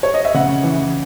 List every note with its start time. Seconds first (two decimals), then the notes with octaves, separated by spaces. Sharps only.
0.03 C#5
0.14 D#5
0.25 E5
0.34 C#3 F#5
0.63 E3